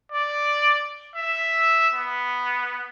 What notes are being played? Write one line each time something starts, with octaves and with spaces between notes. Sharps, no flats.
D5
E5
B3